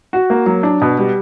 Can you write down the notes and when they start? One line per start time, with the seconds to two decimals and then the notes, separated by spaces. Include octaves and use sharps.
0.13 F#4
0.30 A#3
0.46 F#3
0.63 D4
0.81 B2
0.98 G3